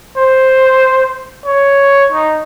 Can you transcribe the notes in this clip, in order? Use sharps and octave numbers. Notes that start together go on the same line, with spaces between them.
C5
C#5
D#4